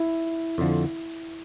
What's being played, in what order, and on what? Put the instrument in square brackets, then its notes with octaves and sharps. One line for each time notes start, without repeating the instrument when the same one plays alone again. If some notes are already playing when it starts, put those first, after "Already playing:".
Already playing: [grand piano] E4
[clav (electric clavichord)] F2 D3 F3